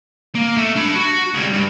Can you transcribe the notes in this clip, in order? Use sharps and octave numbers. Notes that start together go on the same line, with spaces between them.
A#3
A3
D4 B5
F#4
C#2 G3
G2